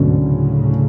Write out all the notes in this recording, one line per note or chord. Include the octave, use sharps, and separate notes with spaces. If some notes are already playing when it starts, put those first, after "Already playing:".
Already playing: D2 G#2 B2 D3 F#3 C#4
A2 C#3